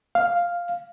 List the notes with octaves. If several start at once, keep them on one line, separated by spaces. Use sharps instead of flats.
F5